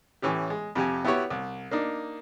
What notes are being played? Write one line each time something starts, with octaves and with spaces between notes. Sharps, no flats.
A2 E3 C#4 G4
G#3
F2 C3 G4 G#5
B3 E4 F#4 G4 C#5
C2
A#3 D4 D#4